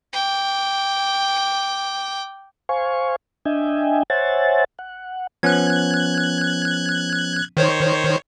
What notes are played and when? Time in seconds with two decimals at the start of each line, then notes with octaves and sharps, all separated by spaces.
0.13 G5 D6
2.69 C5 F5 G#5 C#6
3.45 D4 D#5 E5 G5 G#5
4.10 C5 C#5 E5 F#5 G#5 A6
4.79 F#5
5.43 F3 B3 C#4 F#6 G#6
7.57 D#3 C5 C#5